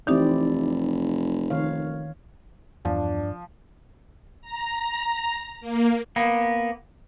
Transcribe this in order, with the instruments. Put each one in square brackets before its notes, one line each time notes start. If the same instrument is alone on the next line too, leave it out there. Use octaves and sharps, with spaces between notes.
[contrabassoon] F1 [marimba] E3 D#4 G4 [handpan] C4 E4 D5
[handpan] D#3 C#5 F5
[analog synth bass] E2 [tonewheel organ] G2 [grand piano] F3 [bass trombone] D4
[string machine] A#5
A#3
[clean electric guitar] A#3 B3